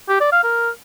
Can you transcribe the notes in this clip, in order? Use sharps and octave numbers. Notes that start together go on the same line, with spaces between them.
G4
D5
F5
A#4